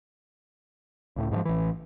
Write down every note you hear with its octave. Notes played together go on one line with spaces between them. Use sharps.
C#2 A2
G#2 C3 F3
A1 E3